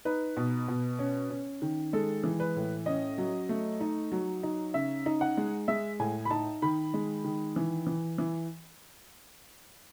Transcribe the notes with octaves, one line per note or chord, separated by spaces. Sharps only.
D#4 B4
B2
B2
C#4
C#4
D#3
G#3 A4
E3
B4
A2
C#4 D#5
F#3
A3
D#4
F#3
D#4
C#3 E5
D#4
F#5
G#3
G#3 E5
A2 G#5
B5
D#4 A5
D#3 B5
G#3
D#3
E3
E3
E3